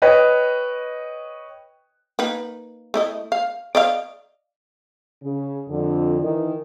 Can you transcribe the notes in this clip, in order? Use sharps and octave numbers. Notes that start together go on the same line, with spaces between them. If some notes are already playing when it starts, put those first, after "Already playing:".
B4 C#5 D#5 G5
A#3 D#4 B4
A3 E4 D#5
F5
D5 D#5 F5
C#3
F2 D3
D#3 E3